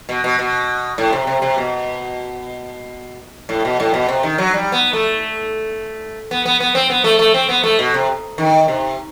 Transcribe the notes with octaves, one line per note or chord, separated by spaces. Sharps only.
B2
B2
B2
A2
C3
C3
C3
B2
A2
B2
A2
B2
C3
D#3
F#3
G3
B3
A3
B3
B3
B3
C4
B3
A3
A3
C4
B3
A3
B2
C3
D#3
C3